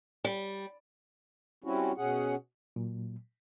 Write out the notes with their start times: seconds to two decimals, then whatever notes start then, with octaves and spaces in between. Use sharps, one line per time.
0.24 G3
1.64 G3 C4 C#4 E4 F#4
1.97 B2 C#4 G#4 F#5
2.76 A#2 F#3